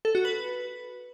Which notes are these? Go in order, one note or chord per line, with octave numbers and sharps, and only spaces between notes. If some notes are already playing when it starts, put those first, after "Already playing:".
A4
F#4
B4